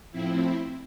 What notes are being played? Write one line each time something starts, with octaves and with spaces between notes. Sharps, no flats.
A2 F3 C4 E4